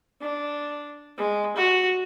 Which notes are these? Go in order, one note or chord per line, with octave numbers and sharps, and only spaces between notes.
D4
G#3
F#4